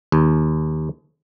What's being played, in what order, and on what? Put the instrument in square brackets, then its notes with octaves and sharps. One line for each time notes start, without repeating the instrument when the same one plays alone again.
[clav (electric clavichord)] D#2